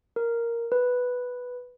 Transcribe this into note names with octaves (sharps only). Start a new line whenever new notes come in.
A#4
B4